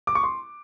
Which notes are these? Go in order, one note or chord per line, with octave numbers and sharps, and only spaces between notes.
D6
C#6
C6